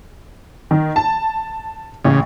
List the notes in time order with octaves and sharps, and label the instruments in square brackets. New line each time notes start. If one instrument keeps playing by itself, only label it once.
[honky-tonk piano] D#3
A5
[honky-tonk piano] A1 [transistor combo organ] C#3